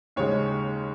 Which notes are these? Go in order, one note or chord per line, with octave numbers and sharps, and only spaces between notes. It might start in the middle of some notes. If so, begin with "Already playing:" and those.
D#2 C#3 G#3 C#5